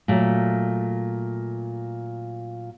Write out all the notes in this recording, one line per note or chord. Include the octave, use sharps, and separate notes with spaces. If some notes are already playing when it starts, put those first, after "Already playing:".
A#2 F#3 A3